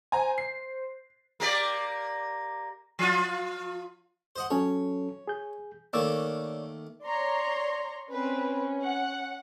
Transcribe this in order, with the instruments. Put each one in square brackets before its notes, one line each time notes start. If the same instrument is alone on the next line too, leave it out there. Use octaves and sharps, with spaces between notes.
[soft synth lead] C5 [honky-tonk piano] G#5 A#5
[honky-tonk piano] C7
[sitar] A#3 G4 D5
F3 F4
[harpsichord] C5 D#5 F#5
[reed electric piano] F#3 C#4 A4 [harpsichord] C#5
[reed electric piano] G#4 G6
[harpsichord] D#3 A3 A#3 [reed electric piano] C#5 D5 E6
[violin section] C#5 A#5 C6 [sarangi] D5
[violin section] C4 B4 [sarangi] C#4
[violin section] F#5